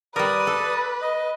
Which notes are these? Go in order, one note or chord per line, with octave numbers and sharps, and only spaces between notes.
G3 A#4 B4 D5 D#6
A4
D#5